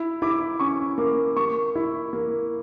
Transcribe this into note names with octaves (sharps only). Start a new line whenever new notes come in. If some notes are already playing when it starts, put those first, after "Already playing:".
Already playing: E4
E4 D6
C#4 C#6
A#3 D6
A#3 C#6
E4
A#3